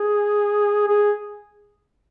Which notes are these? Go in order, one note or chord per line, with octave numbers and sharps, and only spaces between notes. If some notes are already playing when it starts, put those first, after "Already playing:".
Already playing: G#4
G#4